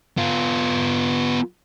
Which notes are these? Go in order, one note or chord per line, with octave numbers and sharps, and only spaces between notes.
B3 F4